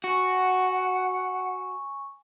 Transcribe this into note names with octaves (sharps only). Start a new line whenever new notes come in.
F#4 F#5 G#5 C#6